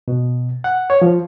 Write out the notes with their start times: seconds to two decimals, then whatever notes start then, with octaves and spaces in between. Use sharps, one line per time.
0.08 B2
0.64 F#5
0.90 C#5
1.02 F3